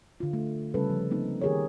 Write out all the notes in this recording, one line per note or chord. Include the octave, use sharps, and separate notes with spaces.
D3 F4
A3
C#3 G3 C#4 A4 B4
F3
A#3 C4 D#4
D#3 G4 G#4 A#4 C#5